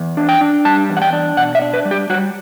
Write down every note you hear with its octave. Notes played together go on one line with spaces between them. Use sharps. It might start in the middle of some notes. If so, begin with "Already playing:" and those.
Already playing: E2
D4
G5
D4
G3 A5
E2
F#5
G5
D4
B2 F#5
E5
D4
B4
G3
G4
G3 F#4